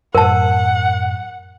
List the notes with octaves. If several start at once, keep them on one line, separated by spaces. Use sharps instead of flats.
F#2 A2 A#4 F#5 A5